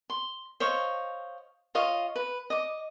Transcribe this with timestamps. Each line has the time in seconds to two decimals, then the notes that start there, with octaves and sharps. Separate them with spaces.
0.10 C6
0.60 C5 C#5 D#5 F5
1.75 F4 C#5 D#5 F5
2.16 B4
2.50 D#5 D6